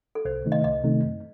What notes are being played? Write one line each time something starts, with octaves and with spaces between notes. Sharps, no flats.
A4
C2 C5
C3 D#3 A3 D#4
D#5
C2 D#5
C3 D#3 A3 D#4
F#2